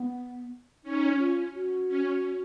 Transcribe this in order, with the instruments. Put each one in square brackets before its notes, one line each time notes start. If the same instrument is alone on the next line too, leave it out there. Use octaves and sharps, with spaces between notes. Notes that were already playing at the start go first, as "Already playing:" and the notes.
Already playing: [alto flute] B3
[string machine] C#4 [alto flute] D#4
[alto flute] F4
F#4
[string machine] C#4